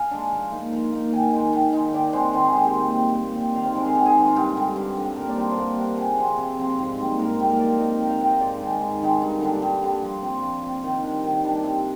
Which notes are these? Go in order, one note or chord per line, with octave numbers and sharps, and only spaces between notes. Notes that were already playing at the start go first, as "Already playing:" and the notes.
Already playing: F5 G#5
G#3 D4
F3
A#3 D#4
F3 A#5
A#3 D#4
D#3 G#5
G#3 D#4
D#3
G#3 D#4
D#3 D5
G#3 C4 C5
D#3 C5
G#4
G#3 C4 G4
G4
A#2
G3 C4
A#2
G3 C4
D#3 F5
C5
G#3 C4 A#4
G#4
D#3 A#4
G#4
G#3 C4
F4
G2 G4
D3 G3
G2
D3 G3
A#2 A#4
D5
G3 D4 F4 C5
C5
A#2 A#4
G3 D4 F4
C3 G#4
F3 C4
C3
F3 C4
G#2
G3 A#3
G#2 A#4
G3 A#3 G4
A#4
F3 D5
C4 D#4 D#5
F3 G5
F5
C4 D#4 G5
D#5
G#2 D5
D#3 G#3 D#4
G#2
D#3 G#3 D#4
G2
D3 G3 D4
G2 G4
D3 G3 D4
F3
C4 F4
F3
C4 F4
D#3
G3 D4
D#3
G3 D4
C3